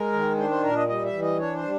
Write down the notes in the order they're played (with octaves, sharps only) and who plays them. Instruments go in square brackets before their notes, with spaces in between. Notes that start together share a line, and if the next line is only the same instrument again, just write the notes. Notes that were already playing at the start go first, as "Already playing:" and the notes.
Already playing: [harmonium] G#3 A#4
D#3
D4 C5
C5
A#2 A#4
D#5
G3 D#5
E5
E3
D#5
D4 C#5
C5
G3